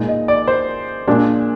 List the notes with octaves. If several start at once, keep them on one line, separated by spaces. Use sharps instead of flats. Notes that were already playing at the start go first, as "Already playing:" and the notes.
Already playing: A#2 G#3 D#4
D#5
D5
C5
A#2 G#3 D4